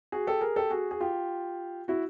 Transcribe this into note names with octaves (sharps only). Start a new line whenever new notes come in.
F#4 G#4
G4 A4
G#4 A#4
G4 A4
F#4 G#4
G#4
F4 G4
E4 F#4